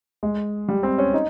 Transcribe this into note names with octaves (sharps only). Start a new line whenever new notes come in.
G#3
G3
C4
C#4
D#4